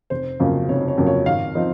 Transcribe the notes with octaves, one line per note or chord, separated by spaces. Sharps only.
F1 C5
F2 C#3 F#3 A#3
F1 C#5
C#5
F2 C#3 F#3 A#3
C#5
G#1 F5
F3 C4 D#4